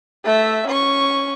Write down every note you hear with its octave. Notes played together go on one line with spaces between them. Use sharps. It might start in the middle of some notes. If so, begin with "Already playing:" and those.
A3 E5
C#4 C#6